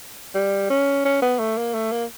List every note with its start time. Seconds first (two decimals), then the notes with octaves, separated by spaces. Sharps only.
0.35 G3
0.70 C#4
1.05 C#4
1.22 B3
1.39 A3
1.57 A#3
1.74 A3
1.92 A#3